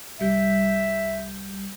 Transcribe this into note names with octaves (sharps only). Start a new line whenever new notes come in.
C2 G3 E5 G6